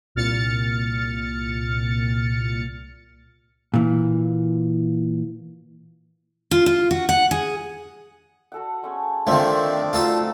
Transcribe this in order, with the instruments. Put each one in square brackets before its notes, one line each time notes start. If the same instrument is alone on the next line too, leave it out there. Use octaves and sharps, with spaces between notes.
[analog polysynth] C2 A#2 F6 A6 C#7
[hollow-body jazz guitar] A#2 E3
[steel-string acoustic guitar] F4
F4
F#4
F#5
G#4
[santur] F#4 A4 F#5
G#3 A3 C#4
[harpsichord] D#3 A3 [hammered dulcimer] F3 C4 [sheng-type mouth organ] D4 [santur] F4 C5
[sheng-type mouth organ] A3 [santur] D4 D#4 F#4 [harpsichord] F4 A4 C6